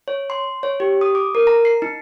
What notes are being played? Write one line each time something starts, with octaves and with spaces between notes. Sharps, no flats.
C#5
C6
C#5
G4
D#6
D6
A#4
A#5
C7
D#4